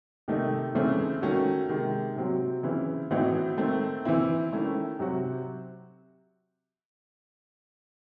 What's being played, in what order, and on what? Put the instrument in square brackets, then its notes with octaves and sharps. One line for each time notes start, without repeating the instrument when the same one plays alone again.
[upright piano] C3 D#3 A3 D#4
C#3 E3 A3 C4
D#3 A3 C#4 F#4
C3 D#3 G#3
C3 F#3 C4 F#4
C#3 E3 C4 E4
A2 E3 C4 D#4 F#4
D#3 A3 C4
E3 C4 E4
D#3 A3 C#4 E4
C3 F#3 C4 F#4